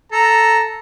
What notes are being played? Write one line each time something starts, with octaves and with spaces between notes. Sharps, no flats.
A4 A#5